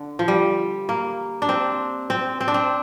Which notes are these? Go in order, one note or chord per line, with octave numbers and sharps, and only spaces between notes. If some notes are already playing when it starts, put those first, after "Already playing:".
Already playing: D3
F3
G3
A#3
D4
C4
C4
C4
D4
C4